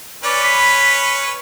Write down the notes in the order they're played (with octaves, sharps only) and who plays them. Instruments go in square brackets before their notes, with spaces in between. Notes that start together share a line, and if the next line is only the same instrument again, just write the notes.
[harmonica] C#4 B4 C#5 [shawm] D5
[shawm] B5